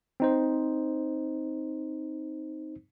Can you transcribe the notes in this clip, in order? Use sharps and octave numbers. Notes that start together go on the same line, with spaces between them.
C4 D#4 C5